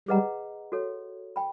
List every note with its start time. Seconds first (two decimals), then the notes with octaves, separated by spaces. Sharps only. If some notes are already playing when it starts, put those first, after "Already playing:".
0.08 G3 G#4 B4 D#5 F#5 A#5
0.72 F#4 A4 C#5
1.36 G5 B5